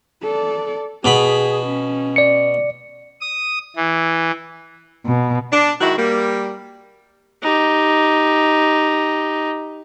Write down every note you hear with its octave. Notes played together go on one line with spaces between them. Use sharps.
A4 D5
B2 G#4 B5
C#4
D5 C#7
D#6
E3
B2
D4
D#3 G#3 E4 F#4
G3 A#3
D#4 G4